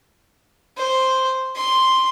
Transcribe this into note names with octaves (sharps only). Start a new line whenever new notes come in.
C5
C6